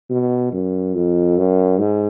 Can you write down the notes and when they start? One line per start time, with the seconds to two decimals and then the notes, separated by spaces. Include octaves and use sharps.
0.10 B2
0.52 F#2
0.94 F2
1.38 F#2
1.79 G#2